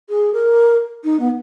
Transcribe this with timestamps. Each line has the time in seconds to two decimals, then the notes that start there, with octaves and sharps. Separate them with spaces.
0.09 G#4
0.33 A#4
1.03 D#4
1.19 B3